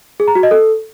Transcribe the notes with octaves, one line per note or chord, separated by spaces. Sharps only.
G#4
A#5
F#4
D#5
A4